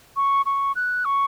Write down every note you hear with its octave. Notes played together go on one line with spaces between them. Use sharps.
C#6
C#6
F#6
C#6